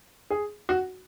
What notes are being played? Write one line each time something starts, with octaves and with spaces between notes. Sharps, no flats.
G#4
F#4